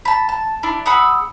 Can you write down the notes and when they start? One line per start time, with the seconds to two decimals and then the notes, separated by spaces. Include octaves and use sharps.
0.05 A5 B5
0.29 A5
0.63 D4 E4
0.86 G#4 F#5 B5 E6